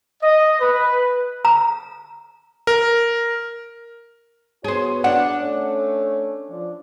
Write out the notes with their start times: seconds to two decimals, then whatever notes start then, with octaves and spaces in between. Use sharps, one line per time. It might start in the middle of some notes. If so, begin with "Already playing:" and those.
0.23 D#5
0.60 B4
1.45 A#5
2.67 A#4
4.64 B3 F#4 G#4 C5 C#5
5.04 D4 F#5
5.39 A3 C#4 C#5
6.49 F3 D4